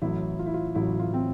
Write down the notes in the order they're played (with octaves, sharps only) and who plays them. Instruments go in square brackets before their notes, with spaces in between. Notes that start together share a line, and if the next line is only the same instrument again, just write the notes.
[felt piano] A1 A2 F#3 E4
F4
E4
F4
A1 A2 F#3 E4
F4
C4